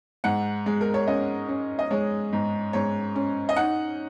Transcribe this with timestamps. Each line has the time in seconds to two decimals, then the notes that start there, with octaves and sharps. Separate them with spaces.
0.24 G#2 F#5
0.66 G#3
0.81 A#4
0.94 C#5
1.07 C#4 D#5
1.49 C#4
1.79 D#5
1.91 G#3 C#5
2.33 G#2
2.73 G#2 C#5
3.16 C#4
3.49 D#5
3.56 D#4 F#5